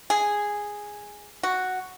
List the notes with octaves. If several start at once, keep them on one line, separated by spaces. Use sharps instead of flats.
G#4
F#4